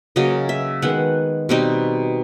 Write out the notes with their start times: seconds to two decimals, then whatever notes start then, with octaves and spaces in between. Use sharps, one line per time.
0.16 C#3 F#3 A#3 D#5
0.49 E5
0.82 D#3 G#3 B3 F#5
1.49 B2 G3 C4 D#4